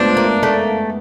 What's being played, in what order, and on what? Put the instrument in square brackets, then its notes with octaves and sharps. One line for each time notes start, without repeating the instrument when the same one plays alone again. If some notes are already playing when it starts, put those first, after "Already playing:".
Already playing: [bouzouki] F3 D4 [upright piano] G#3 A3 B3
[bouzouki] A#3
A3